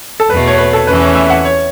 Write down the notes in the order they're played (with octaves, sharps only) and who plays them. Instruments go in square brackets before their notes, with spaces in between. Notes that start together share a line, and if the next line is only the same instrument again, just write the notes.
[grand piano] A4
[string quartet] E2 B2 A3 [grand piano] B4
[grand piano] C#5
B4
A4
[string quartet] E2 E3 A3 C#4 [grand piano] B4
[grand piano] C#5
E5
F#5
C#5